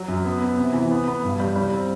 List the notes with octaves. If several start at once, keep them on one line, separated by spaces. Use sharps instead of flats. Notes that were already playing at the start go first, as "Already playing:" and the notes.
Already playing: F#3
F#2
B3
B3
C3
E3
B3
B3
G2
G3
G3
C4